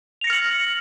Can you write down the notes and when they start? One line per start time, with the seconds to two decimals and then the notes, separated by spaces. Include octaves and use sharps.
0.21 F7
0.24 A#6
0.27 C#7
0.30 F6
0.33 F#7